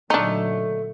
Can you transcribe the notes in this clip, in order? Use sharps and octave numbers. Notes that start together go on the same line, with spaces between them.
A#2 D3 F#3 A3 D4 D#4